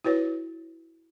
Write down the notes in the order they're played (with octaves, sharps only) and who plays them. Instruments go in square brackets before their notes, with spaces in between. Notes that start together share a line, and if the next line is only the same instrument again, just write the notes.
[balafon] E4 F#4 B4 C#5